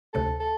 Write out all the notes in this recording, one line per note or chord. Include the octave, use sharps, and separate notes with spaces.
D2 C3 A3 A4
A4